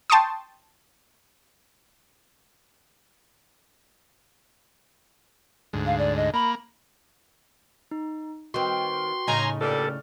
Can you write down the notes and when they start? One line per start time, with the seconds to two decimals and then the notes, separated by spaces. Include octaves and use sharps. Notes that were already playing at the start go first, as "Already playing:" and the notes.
0.10 G5 A5 C6 C#6 D#6
5.73 D2 G#2
5.86 F5
5.98 D5
6.17 D#5
6.34 A#3 B5
7.91 D#4
8.54 D#3 C4 F#4 B4 G5 C6
9.27 A2 C#3 D#4 G#5 A#5
9.61 G2 A#2 G3 A4 D5 F6